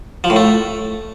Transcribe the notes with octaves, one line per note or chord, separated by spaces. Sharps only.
F3
A2
A3